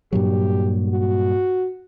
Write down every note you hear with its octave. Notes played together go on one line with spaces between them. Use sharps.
G2 A#2 F#3 G4
F#4